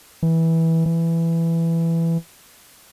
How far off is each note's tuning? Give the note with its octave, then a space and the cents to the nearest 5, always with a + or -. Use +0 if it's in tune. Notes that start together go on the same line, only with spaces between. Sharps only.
E3 -15
E3 +10